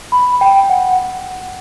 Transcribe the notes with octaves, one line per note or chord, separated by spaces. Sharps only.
B5
G5
F#5